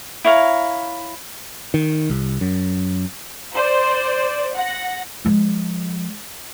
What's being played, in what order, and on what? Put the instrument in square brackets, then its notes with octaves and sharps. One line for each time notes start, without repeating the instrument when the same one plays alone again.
[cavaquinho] E4 C#5 F5 A#5
[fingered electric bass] D#3
C2
F#2
[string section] C5 D5
F#5 A#6
[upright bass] F3 G#3